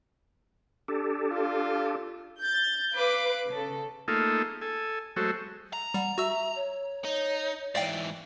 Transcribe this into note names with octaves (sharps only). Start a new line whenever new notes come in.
D4 G4 A4
F4
G6 A6
B4 F5 D6
C#3 A4
A3 A#3 D#4 F4 G#4 A4
A4 G#5
F#3 G#3 A3 F#4 A4 C5
A#5
G3 F#5
F#4 E5 E6
C#5
D#4
G#2 E3 D5 F5 G5